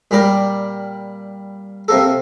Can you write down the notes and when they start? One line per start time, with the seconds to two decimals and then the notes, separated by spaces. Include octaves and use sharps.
0.11 A#2 G3 A#4 D5
1.88 C3 A#3 A4